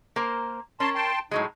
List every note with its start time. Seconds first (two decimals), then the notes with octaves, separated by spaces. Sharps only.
0.16 A#3 A#4 C5
0.80 C#4 A#4 C#5 A5 C6
0.95 G5 A5 C6
1.31 A2 F#3 G#3 D#4